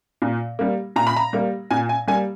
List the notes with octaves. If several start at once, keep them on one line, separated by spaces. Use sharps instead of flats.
A#2
G3 A#3
A#2 A#5
B5
A#5
G3 A#3
A#2 G#5
G#5
G3 A#3 G#5